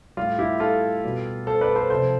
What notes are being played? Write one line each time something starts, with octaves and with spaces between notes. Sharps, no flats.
A2 G3 F4
E4 G4
F4 A4
B2 G3
A4 C5
B4 D5
A4 C5
C3 F3 A4 C5